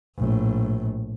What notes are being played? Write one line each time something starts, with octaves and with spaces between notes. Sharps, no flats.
A#1 A2